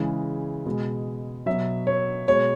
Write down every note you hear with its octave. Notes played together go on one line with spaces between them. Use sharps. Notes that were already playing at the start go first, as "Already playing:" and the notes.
Already playing: C#3 E3 G#3
B2 G#3
B2 F#3 E5
C#5
B2 G#3 C#5